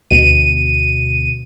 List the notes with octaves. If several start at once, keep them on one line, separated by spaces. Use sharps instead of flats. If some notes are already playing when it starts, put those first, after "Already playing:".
D2 B2 D#7